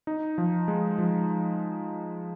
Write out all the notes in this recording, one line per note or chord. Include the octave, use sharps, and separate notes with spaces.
D#4
F3
G#3
F3